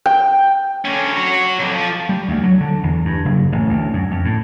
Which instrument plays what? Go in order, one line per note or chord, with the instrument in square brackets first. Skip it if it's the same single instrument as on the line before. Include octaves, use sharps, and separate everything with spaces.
[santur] G5
[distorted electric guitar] D3 C#4
F#4 C#5
B1 F2
F3
[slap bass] G3
D2
F#3
D3
E2
G2
F#1
A1
D2
F#2
F2
A2